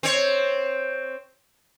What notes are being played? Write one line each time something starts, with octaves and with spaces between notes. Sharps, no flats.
C4 C#5